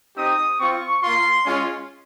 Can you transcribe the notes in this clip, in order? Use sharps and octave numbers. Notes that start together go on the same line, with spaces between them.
C4 D#4 G4 D#6
C4 F4 C#6
A#3 F4 C6
G#3 C#4 F4